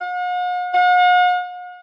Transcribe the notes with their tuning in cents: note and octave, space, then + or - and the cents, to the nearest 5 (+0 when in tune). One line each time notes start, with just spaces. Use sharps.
F#5 -45
F#5 -45